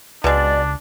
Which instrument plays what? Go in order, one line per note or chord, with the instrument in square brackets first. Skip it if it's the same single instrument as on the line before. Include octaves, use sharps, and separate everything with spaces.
[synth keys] C#2 [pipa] B2 G#3 [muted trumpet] D4 [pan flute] D5